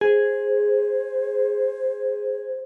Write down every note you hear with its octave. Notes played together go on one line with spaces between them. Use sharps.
G#4 C5